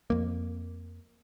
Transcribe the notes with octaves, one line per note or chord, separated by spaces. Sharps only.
F2 A#3